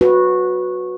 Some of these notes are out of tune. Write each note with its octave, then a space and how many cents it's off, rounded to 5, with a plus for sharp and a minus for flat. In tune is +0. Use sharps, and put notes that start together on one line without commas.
F#4 -15 B4 +0